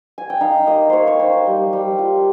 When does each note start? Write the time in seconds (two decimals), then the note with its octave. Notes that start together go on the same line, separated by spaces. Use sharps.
0.18 G#5
0.30 G5
0.41 D#4 F5
0.67 A#3 D#5
0.90 A#3 C5 C#5
1.07 C#5
1.19 D#4 C5
1.33 C5
1.47 G3
1.73 G3
1.99 F4